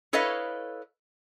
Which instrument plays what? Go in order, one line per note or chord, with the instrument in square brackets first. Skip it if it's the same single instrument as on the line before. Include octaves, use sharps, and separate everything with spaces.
[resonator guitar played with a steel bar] E4 A4 B4 C#5 D#5 F5